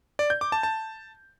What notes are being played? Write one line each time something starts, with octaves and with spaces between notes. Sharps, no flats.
D5
G6
D6
A5
A5